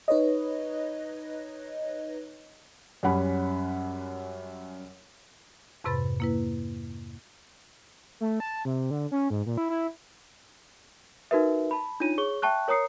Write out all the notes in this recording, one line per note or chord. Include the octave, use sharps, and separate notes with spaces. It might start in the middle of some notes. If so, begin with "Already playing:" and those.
D#4 B4 C#5 D#5
F#2 G3 C#4 F#5 B5
F2 G#2 C3 B4 B5 A6
A#3 E4 B4
A3
A5
C3
D3
C#4
G#2
A#2
E4
E4
D#4 F#4 A#4 B4 E5
A5 B5
D4 D#4 F4 C#5 D#7
G#4 C#5 C#6 G7
E5 G5 A5 C#6 F#6
A#4 C#5 A#5 D#6 C7 C#7